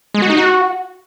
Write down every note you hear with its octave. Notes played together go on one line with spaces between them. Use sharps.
G#3
F#4
D#4
F#4